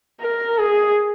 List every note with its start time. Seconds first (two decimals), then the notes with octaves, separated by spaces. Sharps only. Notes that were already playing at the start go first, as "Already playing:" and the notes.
0.21 A#4
0.58 G#4